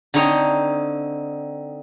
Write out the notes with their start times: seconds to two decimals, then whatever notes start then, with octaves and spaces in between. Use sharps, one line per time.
0.14 D3 C4 D#4 C#5 D#5 G5